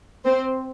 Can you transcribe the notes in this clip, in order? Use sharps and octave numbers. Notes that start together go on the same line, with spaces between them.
C4 C5